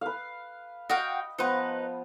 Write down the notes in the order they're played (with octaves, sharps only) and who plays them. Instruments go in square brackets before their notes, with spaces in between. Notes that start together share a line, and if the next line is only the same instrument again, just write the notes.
[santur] B4 F5
[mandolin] F#4 F5 G5 [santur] D#5
[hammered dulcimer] F3 B3 [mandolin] D#4 B4